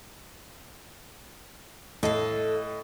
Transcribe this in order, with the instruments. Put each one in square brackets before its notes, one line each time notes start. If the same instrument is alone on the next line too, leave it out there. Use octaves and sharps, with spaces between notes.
[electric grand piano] A2 D#5 [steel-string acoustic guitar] A4 F5